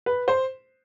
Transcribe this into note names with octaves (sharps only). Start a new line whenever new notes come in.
B4
C5